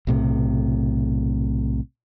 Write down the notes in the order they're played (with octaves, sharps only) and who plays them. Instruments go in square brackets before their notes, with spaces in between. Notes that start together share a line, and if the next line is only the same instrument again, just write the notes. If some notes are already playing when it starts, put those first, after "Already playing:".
[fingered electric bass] B1 A2 C3